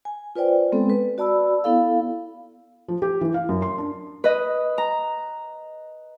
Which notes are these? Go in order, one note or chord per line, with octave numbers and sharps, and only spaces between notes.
G#5
F4 B4 C5 D5 G5
G#3 B3 C4 A4
B4
F#4 D5 A5 B5 E6
B3 E4 A4 F5
F3
G4
E3
F5
F#2
C6
D4
B4 D#5
A#5